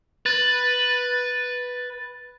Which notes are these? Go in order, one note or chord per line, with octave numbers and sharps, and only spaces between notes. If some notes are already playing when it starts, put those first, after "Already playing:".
B4 A6